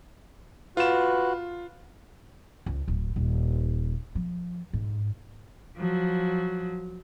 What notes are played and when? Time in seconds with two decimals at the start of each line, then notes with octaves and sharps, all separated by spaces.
0.77 F4 F#4 B4 F#6 E7
2.66 C#2
2.88 D1
3.16 D#1
4.15 F3
4.73 G#2
5.79 F3 F#3